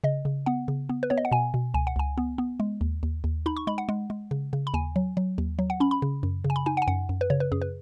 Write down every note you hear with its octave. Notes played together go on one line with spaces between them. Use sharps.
C#3 D#5
C#3
B3 F#5
C#3
B3
B4
B3 C#5
D#5
F#5
B2 G#5
B2
C#2 G#5
F#5
C#2 G#5
B3
B3
G#3
D#2
D#2
D#2
D#4 B5
C#6
G#3 B5
F#5
G#3
G#3
C#3
C#3
B5
D#2 G#5
F#3
F#3
D#2
F#3
F#5
C#4 B5
B5
C#3
F#2
C#3
G#5
B5
D#4 G#5
F#5
G#5
F#2 F#5
F#2
B4
C#3 C#5
B4
F#2 G#4
B4